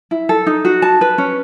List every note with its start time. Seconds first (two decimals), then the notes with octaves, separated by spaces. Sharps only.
0.11 E4
0.29 A4
0.47 D#4
0.65 F#4
0.82 A5
1.01 B4
1.18 C#4